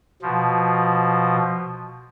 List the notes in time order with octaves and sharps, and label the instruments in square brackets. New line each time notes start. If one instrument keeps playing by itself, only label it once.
[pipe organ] B2 F3